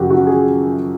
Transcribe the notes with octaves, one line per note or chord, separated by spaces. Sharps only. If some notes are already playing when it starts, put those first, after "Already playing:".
Already playing: F#2 C#3 F3 F#4 G4
F#4
G#4